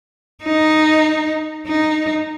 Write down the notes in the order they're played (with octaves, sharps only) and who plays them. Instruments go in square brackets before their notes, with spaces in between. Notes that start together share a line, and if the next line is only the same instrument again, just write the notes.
[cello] D#4
D#4